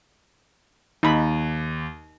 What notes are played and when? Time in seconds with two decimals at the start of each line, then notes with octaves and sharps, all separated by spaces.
1.03 D#2 D#4 B5